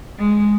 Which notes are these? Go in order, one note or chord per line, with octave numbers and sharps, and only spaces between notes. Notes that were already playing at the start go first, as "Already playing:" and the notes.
G#3